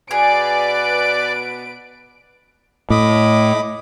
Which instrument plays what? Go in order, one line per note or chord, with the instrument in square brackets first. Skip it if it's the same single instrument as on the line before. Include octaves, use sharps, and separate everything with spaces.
[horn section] B2 B3 B4 [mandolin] G#4 [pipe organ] D5 [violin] D7
[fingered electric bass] A2 [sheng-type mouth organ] D#5 B5 D6